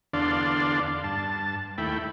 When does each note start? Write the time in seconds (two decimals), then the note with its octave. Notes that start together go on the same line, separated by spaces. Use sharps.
0.13 E2 D3 D4 D5 F5 C6
1.04 G2 A5
1.78 D#2 A3 E4 G5 B5